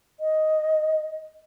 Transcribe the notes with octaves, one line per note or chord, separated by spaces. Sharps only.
D#5